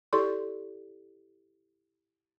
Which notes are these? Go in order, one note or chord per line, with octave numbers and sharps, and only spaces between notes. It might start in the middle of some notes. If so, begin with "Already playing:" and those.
E4 G4 A4 D5 C6 C#6